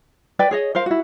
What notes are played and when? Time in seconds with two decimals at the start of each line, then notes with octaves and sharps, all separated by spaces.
0.39 B4 D5 G5
0.51 G#4 C#5 D#5
0.75 A#4 C5 F5
0.86 E4 F#4